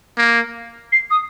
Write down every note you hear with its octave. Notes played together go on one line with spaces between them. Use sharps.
A#3
C7
D#6